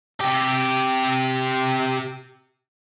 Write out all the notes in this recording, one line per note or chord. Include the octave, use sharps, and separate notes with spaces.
C3 G4